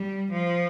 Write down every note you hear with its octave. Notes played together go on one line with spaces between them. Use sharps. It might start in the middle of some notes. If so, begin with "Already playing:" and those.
Already playing: G3
F3